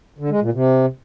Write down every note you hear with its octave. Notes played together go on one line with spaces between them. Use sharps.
D3
G#3
A#2
C3